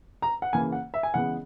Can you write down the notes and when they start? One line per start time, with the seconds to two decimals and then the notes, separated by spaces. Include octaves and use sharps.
0.22 A#5
0.42 F#5
0.53 C#3 E3 A#3 G#5
0.72 F#5
0.94 E5
1.03 G#5
1.14 C#3 E3 G#3 B3 F#5